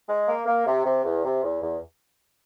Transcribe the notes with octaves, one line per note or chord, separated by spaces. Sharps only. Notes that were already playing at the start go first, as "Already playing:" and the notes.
G#3
A#3
A#3
C3
C3
E2
C3
E2
E2